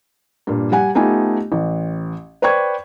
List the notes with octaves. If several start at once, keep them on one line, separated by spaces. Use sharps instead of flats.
G2 A#2
G3 F#5 G#5
A3 B3 D#4 F4 G4 G#5
A1
B4 C5 D5 G5 C#6 G#6